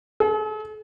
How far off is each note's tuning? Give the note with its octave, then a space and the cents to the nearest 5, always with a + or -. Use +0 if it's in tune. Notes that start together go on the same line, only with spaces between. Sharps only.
A4 -45